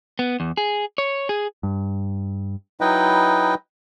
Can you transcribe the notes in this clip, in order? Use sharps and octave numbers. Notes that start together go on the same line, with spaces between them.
B3
E2
G#4
C#5
G#4
G2
F#3 D#4 E4 B4 D#5 G5